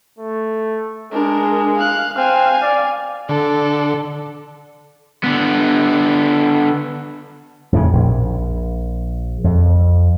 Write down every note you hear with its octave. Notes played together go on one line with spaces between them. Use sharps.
A3
G#3 D4 A#4
F5 F#6
C4 F5 G#5
D5
D3 A4
D3 B3
F2 A2 C#3
A#1
F2